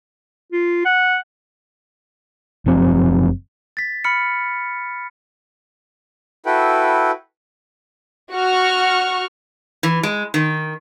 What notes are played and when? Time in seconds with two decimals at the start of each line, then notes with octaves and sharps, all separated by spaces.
0.52 F4
0.85 F#5
2.66 F#1 F3 C4
3.77 A6 B6
4.04 B5 F6 C#7
6.46 E4 F#4 A4 B4 G5
8.34 F#4 C#6 F6
9.83 E3
10.03 G#3
10.34 D#3